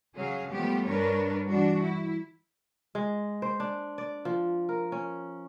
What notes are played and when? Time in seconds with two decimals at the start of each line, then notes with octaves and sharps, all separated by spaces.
0.15 C#3 F#3 G#4 F5
0.49 F3 G3 A3 B3 G4
0.86 G2 D4 A#4 B4 C#5
1.47 E3 G3 D4 F#4
1.80 E4
2.95 G#3
3.42 C5
3.60 D4
3.98 D5
4.25 F3
4.69 A#4
4.92 C#4